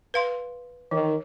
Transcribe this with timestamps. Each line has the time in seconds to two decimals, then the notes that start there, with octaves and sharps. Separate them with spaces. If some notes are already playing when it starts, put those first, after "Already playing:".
0.14 B4 F5 C6
0.91 D#3 E3